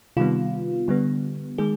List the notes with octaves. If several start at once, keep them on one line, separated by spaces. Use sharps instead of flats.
C3 D#3 G3 B3 F4
D3 G3 B3
D#3 G#3 G#4